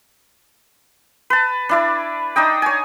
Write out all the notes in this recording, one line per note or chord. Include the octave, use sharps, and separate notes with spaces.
B4 A5
D4 E4 D5
D4 D#4 D#5 G5
C#5 G#5